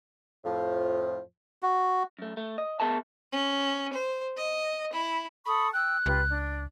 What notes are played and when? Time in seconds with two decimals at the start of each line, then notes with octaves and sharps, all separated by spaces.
0.45 F2 A2 F3
1.63 F#4
2.19 F#2 A3
2.37 A3
2.58 D#5
2.80 B3 G#4 A#4 E5 A5
3.32 C#4
3.93 C5
4.37 D#5
4.93 E4
5.46 A4 B5 C#6 D#6
5.73 G5 E6 F#6
6.06 C#2 F4 G4 B4
6.29 D4